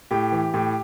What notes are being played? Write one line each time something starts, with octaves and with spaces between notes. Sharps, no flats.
A2 G4 G5
E3
A2 G4 G5